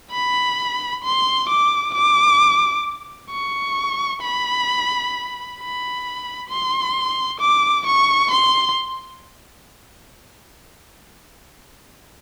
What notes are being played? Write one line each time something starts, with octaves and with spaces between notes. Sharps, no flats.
B5
C6
D6
D6
C#6
B5
B5
C6
D6
C#6
C6